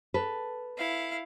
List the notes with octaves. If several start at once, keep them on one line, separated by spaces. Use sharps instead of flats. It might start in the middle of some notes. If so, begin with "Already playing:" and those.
A4 B4
E4 F5